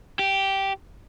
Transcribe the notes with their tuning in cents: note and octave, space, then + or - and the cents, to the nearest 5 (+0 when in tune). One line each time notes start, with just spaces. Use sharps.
G4 -10